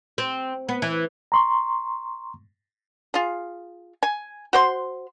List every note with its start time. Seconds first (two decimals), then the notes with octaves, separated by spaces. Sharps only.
0.18 C4
0.69 B3
0.82 E3
1.32 A#5 C6 C#6
3.14 F4 G#4
4.03 G#5
4.53 F#4 C5 C6